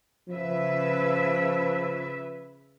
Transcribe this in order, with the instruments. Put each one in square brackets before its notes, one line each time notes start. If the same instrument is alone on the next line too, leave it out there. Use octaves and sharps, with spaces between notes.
[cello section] C#3 B4 E5 [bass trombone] F3